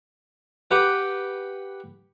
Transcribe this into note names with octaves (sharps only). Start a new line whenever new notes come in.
G4 B4 F#5